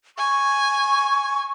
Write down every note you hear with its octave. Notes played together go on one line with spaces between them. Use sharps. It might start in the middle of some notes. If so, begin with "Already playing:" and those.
G#5 C#6